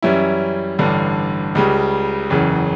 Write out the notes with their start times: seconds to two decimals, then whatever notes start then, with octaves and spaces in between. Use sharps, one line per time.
0.02 F#2 E3 G3 C#4 E4
0.79 A1 G2 D3
1.55 C#2 C#3 G3
2.30 F#1 E2 C#3